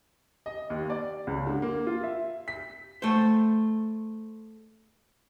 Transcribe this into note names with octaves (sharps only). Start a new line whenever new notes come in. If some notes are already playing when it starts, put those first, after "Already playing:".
D#5
D#2
D5
C#2
D3
A#3
F4
E5
B6
A3 C5